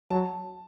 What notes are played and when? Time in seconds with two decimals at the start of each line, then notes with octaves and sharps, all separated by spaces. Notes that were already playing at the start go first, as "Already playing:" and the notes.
0.10 F#3 A5